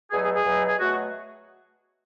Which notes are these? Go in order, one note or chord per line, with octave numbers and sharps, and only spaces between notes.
E2 B2 F#3 A3 G#4
G#4
G#4
E2 B2 F#3 A3
G#4
B2 F#3 A3 F#4